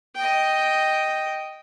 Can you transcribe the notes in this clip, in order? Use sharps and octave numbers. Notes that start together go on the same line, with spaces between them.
D#5 G5